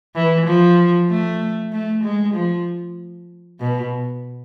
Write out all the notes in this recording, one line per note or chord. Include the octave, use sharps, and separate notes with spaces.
E3
F3
A3
A3
G#3
F3
B2